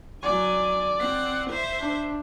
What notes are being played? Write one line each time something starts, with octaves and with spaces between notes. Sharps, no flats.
F#3 D5 G#5
C4 F#5
C5 E5
D4